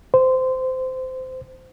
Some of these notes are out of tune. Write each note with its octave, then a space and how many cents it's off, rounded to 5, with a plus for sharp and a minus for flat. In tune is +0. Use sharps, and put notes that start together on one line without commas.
C5 -20